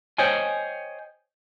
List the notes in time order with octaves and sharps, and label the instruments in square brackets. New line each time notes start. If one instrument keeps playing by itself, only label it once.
[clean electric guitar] C5 C#5 D#5 G5 G#5